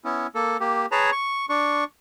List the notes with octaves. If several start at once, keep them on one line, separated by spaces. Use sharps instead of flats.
B3 C#4 E4
A#3 A4
A#3 G4
G#4 B4 C#5 A5 A#5
C#6
D4 C#6